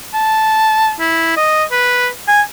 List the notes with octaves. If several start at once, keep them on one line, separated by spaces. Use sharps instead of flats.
A5
E4
D#5
B4
G#5